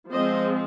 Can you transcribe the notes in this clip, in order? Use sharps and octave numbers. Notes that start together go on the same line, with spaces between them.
F3 G#3 C4 C5 D#5